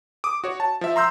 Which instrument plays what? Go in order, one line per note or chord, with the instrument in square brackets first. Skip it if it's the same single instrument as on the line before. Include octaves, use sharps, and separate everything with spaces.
[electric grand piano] D6 D#6
F#4 C#5
A5
F3 E5
A#5 C6 E6 G6